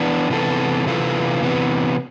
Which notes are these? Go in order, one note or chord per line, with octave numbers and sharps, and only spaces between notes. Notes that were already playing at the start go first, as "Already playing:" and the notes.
Already playing: E3 B3 D4
C3 E3 B3 F4 A4
C3 E3 B3 F4 A4
C3 E3 B3